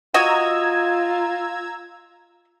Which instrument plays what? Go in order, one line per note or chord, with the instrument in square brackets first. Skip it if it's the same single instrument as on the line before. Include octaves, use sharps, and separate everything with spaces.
[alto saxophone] F4 [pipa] F#4 D#5 [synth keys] A#5 E6 G#6